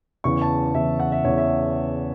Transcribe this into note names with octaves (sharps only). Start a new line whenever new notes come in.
E2 C#3 E3 C#6
A5
E2 C#3 E3 E5
F#5
E5
E2 C#3 E3 C#5
E5